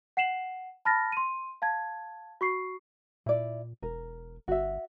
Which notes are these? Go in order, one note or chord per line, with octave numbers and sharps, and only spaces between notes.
F#5 C7 E7 F#7
A5 B5 F6 A6 A#6
C6 D#7
F5 A5 G#6
F#4 C#6 C7
A#2 E4 D5
E1 A#4
G1 F#4 E5